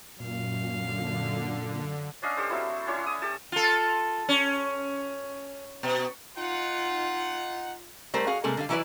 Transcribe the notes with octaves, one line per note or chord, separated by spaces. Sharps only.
F#2 A#2 F5
D3
C#4 D4 D#5 F5
G4 A4 C5
F#3 A3 C4 E4
C#4 D4 E4 C#5
D#6
G4 A4 A5
F4 A4
C#4
B2
D#4 F4 F#5
G3 A3 A#4 C5
F#4 G#4 F5
C3 G3 G#3 A#3 A4
D3 G3 F5
E3 F#3 E4 G4 B4 D5